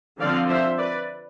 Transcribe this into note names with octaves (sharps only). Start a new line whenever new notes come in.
D3 F3 C4 D5 F5
C5 E5
B4 D5